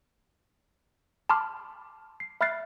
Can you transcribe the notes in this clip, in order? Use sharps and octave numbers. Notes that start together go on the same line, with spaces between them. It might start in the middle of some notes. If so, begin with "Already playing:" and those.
A5 B5 C6 D6 F6
C7
E5 B5 F6 F#6 A6 C7